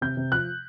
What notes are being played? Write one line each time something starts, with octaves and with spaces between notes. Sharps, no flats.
C3 G6
C3
F3 F#6